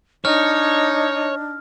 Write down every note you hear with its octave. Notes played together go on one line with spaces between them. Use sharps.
D4 D#4 C#5 F6